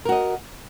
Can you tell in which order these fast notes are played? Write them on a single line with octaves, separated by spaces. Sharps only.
A#4 F#4 D#5